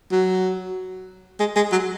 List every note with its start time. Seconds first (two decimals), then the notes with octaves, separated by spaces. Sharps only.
0.12 F#3
1.40 G#3
1.56 G#3
1.72 F#3